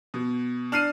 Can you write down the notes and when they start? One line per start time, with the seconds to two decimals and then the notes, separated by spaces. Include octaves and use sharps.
0.14 B2
0.72 D4 F6 C7 D#7